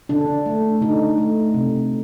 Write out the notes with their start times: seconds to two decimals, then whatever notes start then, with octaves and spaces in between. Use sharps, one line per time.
0.09 D3 D4
0.46 A3
0.81 D3 D#4
1.18 A3
1.54 C3